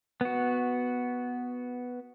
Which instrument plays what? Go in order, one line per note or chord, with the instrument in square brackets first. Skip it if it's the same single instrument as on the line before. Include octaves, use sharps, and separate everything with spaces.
[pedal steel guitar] B3 F#4